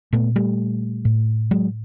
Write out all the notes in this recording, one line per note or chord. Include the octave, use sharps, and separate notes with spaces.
A#2 A3 B3
G3 A3
A2
F#3 G#3